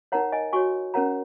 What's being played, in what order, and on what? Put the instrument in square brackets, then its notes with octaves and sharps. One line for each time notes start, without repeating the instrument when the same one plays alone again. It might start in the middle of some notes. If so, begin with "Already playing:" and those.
[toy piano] D#4 A#4 C#5 F#5 A#5
D#5 G#5
F#4 C#5 G#5 C#6
C#4 A#4 C#5 F#5 A#5